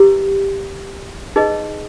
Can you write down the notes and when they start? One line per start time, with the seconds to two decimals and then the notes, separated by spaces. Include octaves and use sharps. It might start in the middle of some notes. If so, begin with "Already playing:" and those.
Already playing: E4 G4 B4
1.36 D#4 G#4 B4 D#5